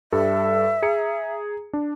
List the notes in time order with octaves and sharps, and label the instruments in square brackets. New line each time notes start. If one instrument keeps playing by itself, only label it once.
[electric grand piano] G2 G3 A4 [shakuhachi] E5
[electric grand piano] G#4 A#5 C#7
D4